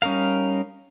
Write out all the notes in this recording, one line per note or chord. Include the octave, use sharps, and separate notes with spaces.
G3 C#4 D#4 A#4 F5